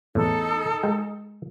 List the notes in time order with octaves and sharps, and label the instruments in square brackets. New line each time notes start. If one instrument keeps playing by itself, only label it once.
[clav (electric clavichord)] E2 A2 [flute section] D#4 A4
[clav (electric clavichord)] G#3 A#4 G5